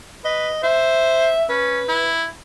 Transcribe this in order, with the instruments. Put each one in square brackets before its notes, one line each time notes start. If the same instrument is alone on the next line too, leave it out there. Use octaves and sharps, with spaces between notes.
[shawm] B4 [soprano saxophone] D#5
[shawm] C5 [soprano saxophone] E5
[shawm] C#4 [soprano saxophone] B4
[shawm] E4